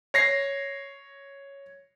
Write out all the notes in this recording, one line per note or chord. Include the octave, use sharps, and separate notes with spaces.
C#5 A#6 C7